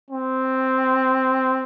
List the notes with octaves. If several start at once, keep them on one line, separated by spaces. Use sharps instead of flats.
C4